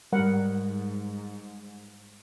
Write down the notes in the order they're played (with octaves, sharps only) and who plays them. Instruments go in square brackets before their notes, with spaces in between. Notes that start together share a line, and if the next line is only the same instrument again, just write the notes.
[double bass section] G#2 [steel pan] G3 A#4 F#5